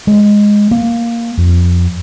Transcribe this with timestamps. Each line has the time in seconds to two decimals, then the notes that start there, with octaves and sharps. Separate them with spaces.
0.07 G#3
0.71 A#3
1.38 F2